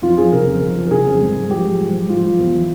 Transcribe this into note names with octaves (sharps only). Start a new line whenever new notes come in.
F2 F4
F3 G#4
C#3 A#4
F2
F2
F3
A#4
C#3 G#4
F2
G#2
G#2
F3 G4
F3
G#2
G#2
F3 F4
F3
E2
E3